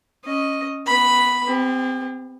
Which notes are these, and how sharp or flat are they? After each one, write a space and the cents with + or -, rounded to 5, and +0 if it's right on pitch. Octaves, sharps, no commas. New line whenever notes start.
C#4 +0 D#5 +0
B3 +0 B5 +0
C4 -25 G4 +45